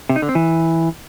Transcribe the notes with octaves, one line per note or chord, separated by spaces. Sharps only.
C3
D#4
D3
C4
E3